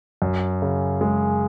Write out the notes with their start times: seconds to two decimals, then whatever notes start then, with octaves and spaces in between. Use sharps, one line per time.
0.22 F#2
0.62 C#3
1.01 G#3